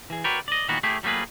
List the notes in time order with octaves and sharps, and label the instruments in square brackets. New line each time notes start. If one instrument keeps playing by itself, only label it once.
[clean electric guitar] E3 G#4
F#4 A#4 B4 C#5 D5 G5
D5 D#5
A#2 D#3 E3 A#3 B3 F#4
A3 E4 G4 G#4
F#3 G3 A3 A#3 G#4 B4